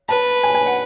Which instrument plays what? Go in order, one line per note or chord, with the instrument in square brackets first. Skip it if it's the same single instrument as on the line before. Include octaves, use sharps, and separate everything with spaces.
[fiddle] B4 [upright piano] A5
[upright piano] G#5
G#5
F#5